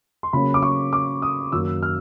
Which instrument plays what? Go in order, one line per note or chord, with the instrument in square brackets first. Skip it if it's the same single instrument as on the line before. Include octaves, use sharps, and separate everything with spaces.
[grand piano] C6
C#3 F#3 A#3 C#4 B5
D6
C#6
D6
D#6
F#2 D#3 F#3 A#3 E6
F6